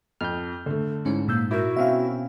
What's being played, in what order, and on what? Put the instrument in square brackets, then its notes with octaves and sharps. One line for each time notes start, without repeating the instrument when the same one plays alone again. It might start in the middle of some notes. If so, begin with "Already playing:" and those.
[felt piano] F2 [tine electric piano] F6 G6
[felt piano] D3 A3
[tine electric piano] G#2 [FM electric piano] C#4 [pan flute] E4
[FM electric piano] A#2 E6 G6 [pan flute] A#3
[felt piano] E4 A#4 [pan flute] F#4
[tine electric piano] B2 C4 C#4 [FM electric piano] E5 F5